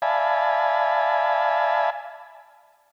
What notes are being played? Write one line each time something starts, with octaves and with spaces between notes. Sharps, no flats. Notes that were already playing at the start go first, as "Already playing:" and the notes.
D5 E5 F5 G#5 A5 B5